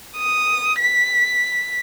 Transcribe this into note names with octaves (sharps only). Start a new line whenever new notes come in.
D#6
B6